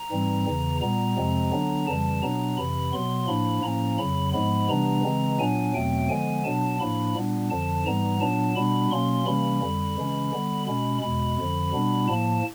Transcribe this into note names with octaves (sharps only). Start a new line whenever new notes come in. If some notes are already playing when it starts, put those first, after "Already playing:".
Already playing: A#5
G#2 E3 G3 C4
E2 C#3 E3
A#2 G3 B3 A#5
F2 C3 F3 G#3 C4
D3 F#3 B3 D4
F2 C#3 E3 G3 A5
B2 F#3 B3 D4 A#5
F2 C3 E3 B5
B2 F#3 B3 C6
A2 F3 A#3 D4 B5
A2 F3 A#3 C#4 A#5
F2 C#3 F#3 B5
G#2 F3 G#3 B3 B5
C3 E3 G3 B3 D4 A#5
C#3 E3 G#3 C4
A#2 F#3 B3 D4 G#5
E2 B2 F#3 A3 C4 G5
D3 F3 G#3 B3 G#5
B2 F#3 B3 D4 A5
A2 F3 A#3 D4 B5
A#2 G3 B3 D4
F2 D3 F3 A5
G#2 E3 G3 B3 A#5
A#2 F#3 B3 D4 A5
B2 G3 B3 D4 B5
B2 F#3 A#3 C#4 C6
C3 E3 G3 A#3 C#4 B5
F2 D3 G3
C#3 E3 G#3 C#4
D3 G3 B3
B2 G#3 C#4 B5
E2 B2 G#3 B5
F2 D3 F3
B2 G3 B3 D4
A2 F3 A#3 A5